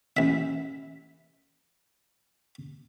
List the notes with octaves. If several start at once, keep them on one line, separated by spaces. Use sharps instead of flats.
A1 E5